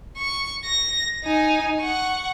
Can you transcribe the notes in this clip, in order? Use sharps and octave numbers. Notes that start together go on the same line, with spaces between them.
C#6
A#6
D#4 G#5
F#5 C#6